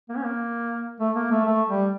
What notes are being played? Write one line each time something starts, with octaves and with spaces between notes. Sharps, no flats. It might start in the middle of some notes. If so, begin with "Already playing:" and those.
A#3
C#4
A#3
A3
A#3
A3
A3
G3